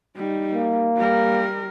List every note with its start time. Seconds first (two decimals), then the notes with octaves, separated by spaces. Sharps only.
0.16 G3 D#4
0.54 A#3
0.96 G3 A#4